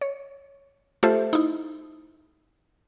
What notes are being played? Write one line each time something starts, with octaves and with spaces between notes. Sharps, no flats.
C#5
A3 F4 G4 A4 C5 E5
D#4 E4